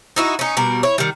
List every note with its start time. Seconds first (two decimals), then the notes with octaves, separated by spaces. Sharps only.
0.16 D#4 E4 F#4
0.39 C#4 D#4
0.57 B2 G3 A#4
0.83 E4 C#5
0.98 D#3 G3